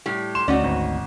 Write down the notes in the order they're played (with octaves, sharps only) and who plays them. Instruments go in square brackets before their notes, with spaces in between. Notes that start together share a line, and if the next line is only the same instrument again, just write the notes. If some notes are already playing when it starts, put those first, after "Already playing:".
[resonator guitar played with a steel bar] A2 G3
[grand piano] C6 E7
[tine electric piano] D2 [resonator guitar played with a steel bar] C#4 D#4 F#4 [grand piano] D5
[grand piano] G#1